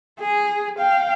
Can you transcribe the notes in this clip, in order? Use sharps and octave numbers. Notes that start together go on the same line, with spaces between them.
G#4
F5 G5